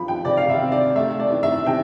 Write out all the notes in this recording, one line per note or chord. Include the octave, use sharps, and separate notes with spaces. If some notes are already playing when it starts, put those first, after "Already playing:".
Already playing: F3 B5
G5
C3 D5
F5
E5
C4
D5
A3 E5
D5
E3
E5
C3 G5